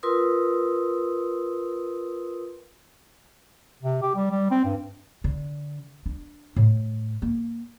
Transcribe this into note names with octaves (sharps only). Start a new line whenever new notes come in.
F4 A#4 B4 C6 D#6 E6
C3
G4
G3
G3
C4
G2
D3
D4
A2
A#3